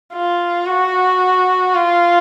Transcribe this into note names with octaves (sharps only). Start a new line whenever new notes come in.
F4
F#4
F4